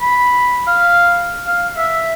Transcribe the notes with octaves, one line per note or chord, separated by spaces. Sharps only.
B5
F5
F5
E5